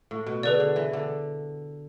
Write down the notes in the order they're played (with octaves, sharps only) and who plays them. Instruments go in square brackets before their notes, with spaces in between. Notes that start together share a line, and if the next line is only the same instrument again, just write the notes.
[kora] A2
B2
[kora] D3 [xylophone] G#4 B4 D5
[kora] D3
E3
D3